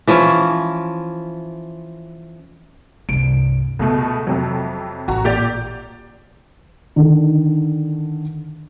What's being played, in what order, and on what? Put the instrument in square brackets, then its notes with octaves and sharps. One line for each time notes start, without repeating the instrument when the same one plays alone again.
[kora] E3 F3 C#4
[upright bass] C2 G2 [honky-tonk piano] D7
[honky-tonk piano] C#2 B2 A3 [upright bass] G3
[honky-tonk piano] F2 C3 F#3
[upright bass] A1 [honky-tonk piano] F#4 A#5
[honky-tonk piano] A#2 G4 D5
[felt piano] D3 D#3